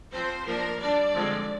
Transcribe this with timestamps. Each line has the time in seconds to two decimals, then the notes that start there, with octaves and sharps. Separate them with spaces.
0.12 F3 C4 C5
0.46 F3 A#3 D4 A#4
0.79 G3 D4 D5
1.14 D3 F3 G#3 C4